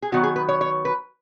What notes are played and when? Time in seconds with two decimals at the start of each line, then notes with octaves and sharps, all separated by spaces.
0.02 G#4
0.12 D#3 F#3 B3 F#4
0.23 G#4
0.36 B4
0.48 C#5
0.61 C#5
0.85 B4